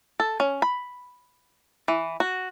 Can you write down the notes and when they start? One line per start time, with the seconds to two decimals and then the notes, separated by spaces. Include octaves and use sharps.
0.20 A4
0.40 C#4
0.62 B5
1.88 E3
2.20 F#4